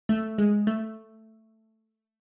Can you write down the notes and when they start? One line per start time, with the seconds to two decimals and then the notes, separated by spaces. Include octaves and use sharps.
0.09 A3
0.38 G#3
0.67 A3